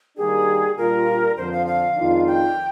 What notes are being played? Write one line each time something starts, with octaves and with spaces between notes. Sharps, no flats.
D#3 G3 A#3 D4 G4 G#4
A#2 G3 D4 F4 A#4
F2 D3 F3 C5
F5
F5
F2 D#3 G#3 D4 F4
G5